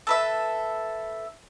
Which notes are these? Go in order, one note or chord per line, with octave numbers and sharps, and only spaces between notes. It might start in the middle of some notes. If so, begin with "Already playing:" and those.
A4 B4 E5